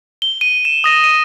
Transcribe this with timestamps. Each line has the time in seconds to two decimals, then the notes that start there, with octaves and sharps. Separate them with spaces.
0.22 G7
0.41 D#7
0.65 E7
0.84 D#6 A#6 D#7
1.04 D#7